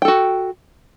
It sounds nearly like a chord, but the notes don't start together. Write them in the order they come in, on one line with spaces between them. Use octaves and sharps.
G5 A4 F#4